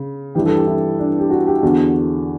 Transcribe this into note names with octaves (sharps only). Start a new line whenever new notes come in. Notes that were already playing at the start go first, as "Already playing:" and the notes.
Already playing: C#3
G2 E3 G4
A4
G4
E4
D4
G4
F#4
G4
E2 D3 F#4